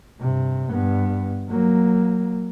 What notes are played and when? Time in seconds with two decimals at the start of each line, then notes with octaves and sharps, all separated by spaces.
0.20 G2 C3
0.69 G2 B3
1.49 F#3 A#3